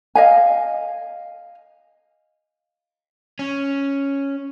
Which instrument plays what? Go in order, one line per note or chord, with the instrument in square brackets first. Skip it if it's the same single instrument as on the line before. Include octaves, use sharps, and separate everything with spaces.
[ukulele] D#5 F5 G#5
[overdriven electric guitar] C#4